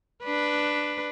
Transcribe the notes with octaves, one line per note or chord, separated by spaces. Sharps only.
D4 B4